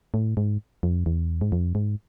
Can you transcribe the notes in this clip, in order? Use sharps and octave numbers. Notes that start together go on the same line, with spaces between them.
A2
G#2
F2
E2
G#2
F2
G#2